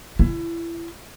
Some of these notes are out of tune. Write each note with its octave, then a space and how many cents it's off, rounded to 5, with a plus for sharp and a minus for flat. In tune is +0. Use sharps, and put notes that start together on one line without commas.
E4 +30